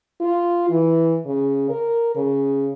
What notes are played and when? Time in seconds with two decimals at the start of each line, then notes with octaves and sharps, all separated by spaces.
0.21 F4
0.70 E3
1.26 C#3
1.70 A#4
2.16 C#3